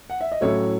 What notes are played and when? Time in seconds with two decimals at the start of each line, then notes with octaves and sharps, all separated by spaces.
0.10 F#5
0.21 E5
0.32 D#5
0.41 A2 F#3 C#4 E4 A4 C#5